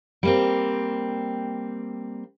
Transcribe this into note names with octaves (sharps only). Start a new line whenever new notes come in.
G3 A#3 C4